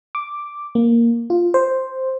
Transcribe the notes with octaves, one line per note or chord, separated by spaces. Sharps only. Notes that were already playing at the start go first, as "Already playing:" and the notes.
D6
A#3
F4
C5